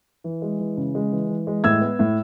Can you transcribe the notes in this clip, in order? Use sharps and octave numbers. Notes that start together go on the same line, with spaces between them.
E3
G#3
E3
C#3
G#3
E3
E3
G#3
A2 E6 G#6
B3
A2